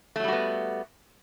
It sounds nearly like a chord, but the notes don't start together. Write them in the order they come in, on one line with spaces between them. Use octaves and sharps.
A3 F#3 G3 F#4 B3